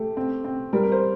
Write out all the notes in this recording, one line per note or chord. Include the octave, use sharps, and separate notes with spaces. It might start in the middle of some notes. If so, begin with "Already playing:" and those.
Already playing: A3 G4
C4
C4
G3 A#4
A#4
C5